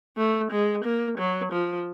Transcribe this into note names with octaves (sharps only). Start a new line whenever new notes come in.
A3
G#3
A#3
F#3
F3